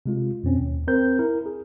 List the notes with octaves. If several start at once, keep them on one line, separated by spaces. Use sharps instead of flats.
C3 G#3 F4
F2 B2 C4 C#4
D#2
C4 A#4 C5 G6
E4 A#4
G#4